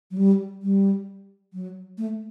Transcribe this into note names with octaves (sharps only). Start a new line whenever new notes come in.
F#3
G3
G3
F#3
A3